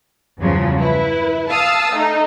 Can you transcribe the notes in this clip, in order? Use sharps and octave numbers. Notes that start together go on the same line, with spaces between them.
E2 G2 C#3 F3 F#3
E4 B4
F5 A5 D#6 E6
A3 D#4